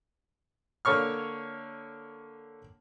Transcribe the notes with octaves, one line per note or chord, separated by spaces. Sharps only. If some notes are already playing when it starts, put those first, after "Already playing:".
D3 A#3 C#5 C#6 F6